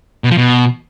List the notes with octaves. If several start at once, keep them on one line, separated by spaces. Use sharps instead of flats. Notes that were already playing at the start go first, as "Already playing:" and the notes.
B2
F3
B2